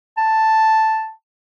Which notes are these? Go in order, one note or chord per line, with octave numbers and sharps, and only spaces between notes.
A5